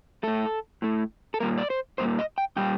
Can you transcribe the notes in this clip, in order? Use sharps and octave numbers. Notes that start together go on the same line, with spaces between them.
A2 A3 A4
A2 A3
A4
A#2 G3 A#3 A#4
D5
C5
A#2 G3 A#3 C5
D#5
G5
A#2 G3 G5